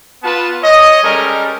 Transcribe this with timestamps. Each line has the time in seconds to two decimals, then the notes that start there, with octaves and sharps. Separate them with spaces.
0.23 B3 F4 B4 A5
0.62 C#5 D#5
1.03 G3 G#3 C#4 A4 A#4